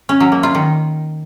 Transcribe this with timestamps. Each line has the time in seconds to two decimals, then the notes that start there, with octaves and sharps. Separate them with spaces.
0.09 C#4
0.20 F#3
0.32 A#3
0.43 F4
0.55 D#3